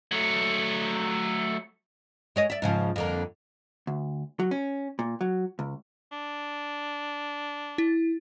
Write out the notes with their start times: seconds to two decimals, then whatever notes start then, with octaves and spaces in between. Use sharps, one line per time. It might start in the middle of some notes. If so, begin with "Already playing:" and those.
0.11 F#3 A3
2.36 G#3 C#5 D#5
2.50 D5 E5
2.62 G#2 C#3 F3
2.96 F2 D3 A#3
3.87 D2
4.40 F#3
4.51 C#4
4.99 A#2
5.21 F#3
5.59 C#2
6.12 D4
7.78 E4